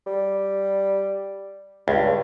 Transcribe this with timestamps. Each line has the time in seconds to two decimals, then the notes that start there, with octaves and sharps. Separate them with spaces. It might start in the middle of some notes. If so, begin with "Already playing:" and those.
0.06 G3
1.88 C#2 G2